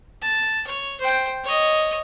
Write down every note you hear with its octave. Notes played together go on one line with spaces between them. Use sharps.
A5
C#5
C5 G5
C#5 D#5